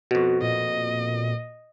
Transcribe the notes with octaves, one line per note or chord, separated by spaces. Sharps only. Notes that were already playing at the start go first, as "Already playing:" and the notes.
F2 B2 F#4
A#2 D#5